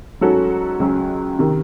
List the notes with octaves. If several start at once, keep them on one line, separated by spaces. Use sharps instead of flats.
G#2 F#3 C#4 F#4 A4
C#2 C#3 F#3 C#4
C3 D#3